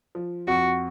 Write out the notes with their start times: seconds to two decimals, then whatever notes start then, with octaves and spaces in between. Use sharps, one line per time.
0.15 F3
0.47 F2 F#4